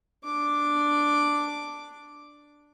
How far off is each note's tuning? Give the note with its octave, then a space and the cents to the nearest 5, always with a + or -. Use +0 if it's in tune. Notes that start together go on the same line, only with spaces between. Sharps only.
D4 +0 D6 +0